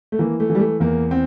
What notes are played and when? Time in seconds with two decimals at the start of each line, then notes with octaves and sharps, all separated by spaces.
0.12 A3
0.19 E3 A#3
0.40 A3
0.50 E3
0.55 G3
0.60 A3
0.80 E2 A#3
1.11 C4